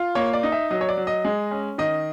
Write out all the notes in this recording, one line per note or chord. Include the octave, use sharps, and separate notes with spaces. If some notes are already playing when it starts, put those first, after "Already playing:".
Already playing: F4
A#3 C#5
D5
D#4
E5
F#3 D#5
C#5
D5
F#3
D#5
G#3
C#4
D#3 D#5